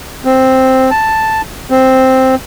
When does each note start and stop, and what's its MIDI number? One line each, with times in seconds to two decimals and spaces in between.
0.25 0.90 60
0.91 1.42 81
1.70 2.35 60